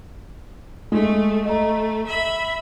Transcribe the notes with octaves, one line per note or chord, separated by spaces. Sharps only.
G#3 A3
A3 D#5 A#5
E5 B5